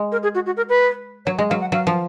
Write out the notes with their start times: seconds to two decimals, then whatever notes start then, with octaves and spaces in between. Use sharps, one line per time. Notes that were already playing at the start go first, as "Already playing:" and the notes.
Already playing: G#3
0.12 A#4
0.23 G#4
0.35 F#4
0.46 F#4
0.57 A#4
0.69 B4
1.26 F#3 C#5
1.37 G#3 D#5
1.49 F#3 F5
1.61 F#5
1.72 F#3 F5
1.87 F3